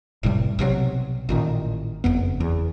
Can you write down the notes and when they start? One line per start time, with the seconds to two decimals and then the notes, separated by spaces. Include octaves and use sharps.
0.23 F1 A2 C3 G3
0.59 B1 C3 F3 F#3
1.29 A1 A#2 D#3
2.04 F#1 F2 B3
2.40 E2